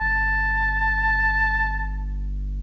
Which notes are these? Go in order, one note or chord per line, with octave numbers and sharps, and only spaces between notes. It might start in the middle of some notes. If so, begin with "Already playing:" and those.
G1 A5